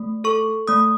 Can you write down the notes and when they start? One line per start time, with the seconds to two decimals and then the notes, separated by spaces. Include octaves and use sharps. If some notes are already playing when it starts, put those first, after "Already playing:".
Already playing: A3
0.24 A4 C#6
0.68 A3 D#6